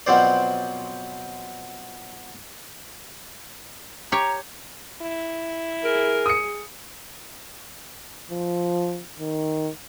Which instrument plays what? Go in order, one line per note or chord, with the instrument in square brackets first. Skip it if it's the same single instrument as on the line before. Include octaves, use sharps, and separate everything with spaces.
[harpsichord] B2 F3 F#3 C4 C5 D5
[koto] G4 C#5 [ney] A#5
[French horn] E4
[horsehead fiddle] G#4 [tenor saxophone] A#4
[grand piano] D#6 C#7
[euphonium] F3
D#3